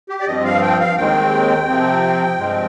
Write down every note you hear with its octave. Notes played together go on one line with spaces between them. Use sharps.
G4
D5
G2 F3 C4 D#5
F5
G5
F5
D#2 D#3 G#3 C4 G5
C3 F3 C4
G2 F3 G#3 C4